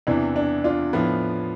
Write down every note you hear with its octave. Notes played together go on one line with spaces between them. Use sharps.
E2 C3 E3 D4
D4
D4 F4
A2 F3 B3